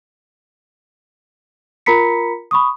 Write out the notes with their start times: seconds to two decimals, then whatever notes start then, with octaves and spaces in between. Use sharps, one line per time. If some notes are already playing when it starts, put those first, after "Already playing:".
1.86 F4 A#4 A#5 B5 B6 C#7
2.51 B5 C#6 D#6